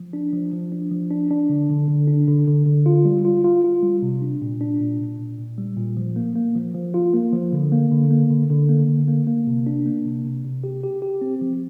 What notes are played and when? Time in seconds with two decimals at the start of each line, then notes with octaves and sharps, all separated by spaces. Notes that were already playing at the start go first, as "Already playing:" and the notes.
Already playing: F3
0.13 D4
0.33 F3
0.53 F3
0.72 D4
0.91 F3
1.11 D4
1.31 D4
1.49 D3
1.70 D3
1.88 D3
2.08 D4
2.28 D3
2.47 D3
2.66 D3
2.86 F4
3.05 G3
3.25 F4
3.44 F4
3.64 F4
3.83 G3
4.02 C3
4.22 D4
4.42 A#2
4.61 D4
4.80 A#2
5.00 A#2
5.19 A#2
5.38 A#2
5.58 G3
5.77 A#2
5.97 F3
6.16 A#3
6.36 A#3
6.55 F3
6.74 F3
6.94 F4
7.14 A#3
7.33 F3
7.53 D3
7.72 A#3
7.92 D3
8.11 A#3
8.30 D3
8.50 D3
8.69 A#3
8.88 D3
9.08 A#3
9.27 A#3
9.47 C3
9.67 D4
9.86 A#3
10.05 C3
10.25 C3
10.45 C3
10.64 G4
10.83 G4
11.02 G4
11.22 C4
11.41 F3